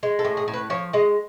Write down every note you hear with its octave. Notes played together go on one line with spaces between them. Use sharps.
G#3
A4
A2
G#4
A2
B4
F3 C#5
G#3 D#5